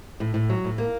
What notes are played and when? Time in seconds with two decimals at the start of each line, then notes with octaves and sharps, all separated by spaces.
0.20 A2
0.34 A2
0.50 F#3
0.64 A2
0.78 A#3